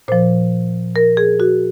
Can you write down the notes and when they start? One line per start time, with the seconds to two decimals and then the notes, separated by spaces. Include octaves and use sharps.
0.08 A#2 F3 C5
0.96 A#4
1.17 G#4
1.40 F#4